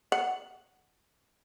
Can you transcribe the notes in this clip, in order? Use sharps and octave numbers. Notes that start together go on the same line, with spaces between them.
F#5